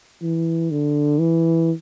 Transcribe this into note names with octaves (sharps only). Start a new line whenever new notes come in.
E3
D3
E3